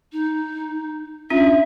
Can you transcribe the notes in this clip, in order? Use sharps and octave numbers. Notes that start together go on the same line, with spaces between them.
D#4
C#4 D4 F4 E5